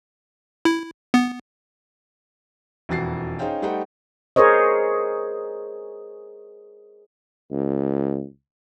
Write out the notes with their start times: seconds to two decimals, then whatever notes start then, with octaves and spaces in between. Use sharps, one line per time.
0.65 E4
1.14 B3
2.89 E1 F2 E3 F#4 A6 C7
3.39 C#4 D#4 G#4 C5 F5 G5
3.62 G3 A3 D#4 C5 F#5 G5
4.36 G#4 A#4 C5 C#5 D#5
7.51 C#2